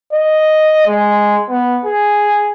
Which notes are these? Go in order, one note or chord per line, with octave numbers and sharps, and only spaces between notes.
D#5
G#3
B3
G#4